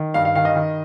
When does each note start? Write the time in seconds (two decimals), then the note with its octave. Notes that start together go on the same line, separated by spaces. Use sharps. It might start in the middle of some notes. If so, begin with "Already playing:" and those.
Already playing: D#3
0.14 G2 F5
0.25 F5
0.35 D#3 F5
0.45 D#5
0.55 D#3